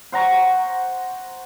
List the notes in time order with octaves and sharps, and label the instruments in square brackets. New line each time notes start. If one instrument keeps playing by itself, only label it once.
[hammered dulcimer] C5 F#5 A#5 C#6